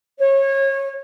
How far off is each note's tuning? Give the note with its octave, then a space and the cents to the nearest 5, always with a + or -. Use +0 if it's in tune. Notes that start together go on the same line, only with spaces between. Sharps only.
C#5 -25